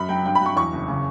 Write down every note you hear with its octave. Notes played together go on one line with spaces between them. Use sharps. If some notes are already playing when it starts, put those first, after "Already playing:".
Already playing: F#2 B5
F#3 G5
G2 G5
B5
F#3 C#6
E2 C#6
F#1
C#3